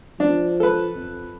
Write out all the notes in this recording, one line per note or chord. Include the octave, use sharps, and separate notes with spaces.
F3 D4
A4 B4
F2